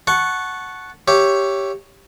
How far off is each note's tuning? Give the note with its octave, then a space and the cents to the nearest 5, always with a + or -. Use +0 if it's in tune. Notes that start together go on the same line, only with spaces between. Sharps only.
F#5 +0 A5 -15 C#6 -10
G4 +0 C#5 +0 E5 +20